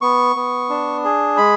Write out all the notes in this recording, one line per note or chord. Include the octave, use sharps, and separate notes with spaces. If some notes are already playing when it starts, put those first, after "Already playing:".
B3 C#6
B3
D4
G#4
G#3 B5